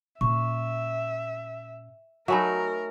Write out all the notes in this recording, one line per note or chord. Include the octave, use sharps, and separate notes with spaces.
A#2 C#4 E5 C#6
F#3 A3 D#4 A#4 E5 G#5 B5